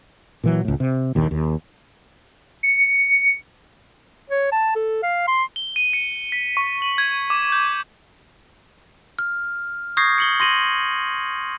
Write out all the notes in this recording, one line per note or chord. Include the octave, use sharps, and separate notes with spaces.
A#2 E3 F#3
C#2 A2
C3
A#1 D#2 A#2 D#3
D#2
C#7
C#5
A5
A4
F5
C6
G7
D#7
C#7
B6
C#6
F#7
G#6
D6
G6
F6
C#6 D#6 G6 G#6 A#6 C7
C#7 F#7 G7
C6 A#6 D#7 F#7